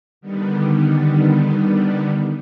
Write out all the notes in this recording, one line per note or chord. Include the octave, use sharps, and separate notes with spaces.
D3 D#3 G3 B3